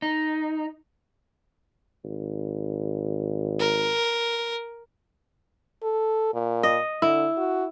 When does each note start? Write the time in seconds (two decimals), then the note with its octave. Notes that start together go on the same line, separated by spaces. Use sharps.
0.02 D#4
2.04 G#1
3.59 A#4
5.83 A4
6.34 A#2
6.63 D#5
7.02 D3 E4
7.37 F#4